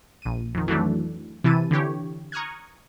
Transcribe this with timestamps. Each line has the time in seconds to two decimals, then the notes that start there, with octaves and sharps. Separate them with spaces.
0.22 A#1 D#7
0.55 F2 D#3
0.68 E3 F#3 A3 D4
1.44 C3 E3 E4 A5 D#7
1.71 D3 E3 G4 C#5
2.32 A#5 C#6 D#6 F6 F#6 G#6